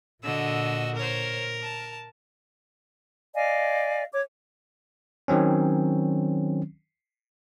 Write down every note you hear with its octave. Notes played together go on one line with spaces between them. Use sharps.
A#2 D3 F#4 D#5 E6
A#4 C5 C#5
A5
D5 D#5 F5 G#5
C#5 D6
D#3 F#3 C4 C#4